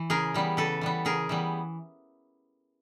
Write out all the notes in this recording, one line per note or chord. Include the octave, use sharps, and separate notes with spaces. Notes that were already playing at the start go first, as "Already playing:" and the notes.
Already playing: E3
C#3 G#4 A#4
E3 G3 B3
C#3 A4 B4
E3 G3 B3
C#3 G#4 A#4
E3 G3 B3